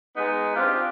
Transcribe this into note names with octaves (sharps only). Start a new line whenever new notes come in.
G#3 B3 D#4
C4 D4 F4 G4